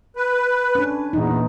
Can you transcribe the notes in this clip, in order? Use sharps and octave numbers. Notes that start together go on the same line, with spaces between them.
B4
C#4 D4
E2 A#2 E3 D#4